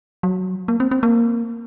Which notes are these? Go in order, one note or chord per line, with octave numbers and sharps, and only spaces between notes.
F#3
A#3
C4
C4
A#3